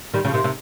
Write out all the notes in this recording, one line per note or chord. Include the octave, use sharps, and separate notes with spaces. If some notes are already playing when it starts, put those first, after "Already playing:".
D#3 G3
C#3 F3
C3 D#3
C3 D#3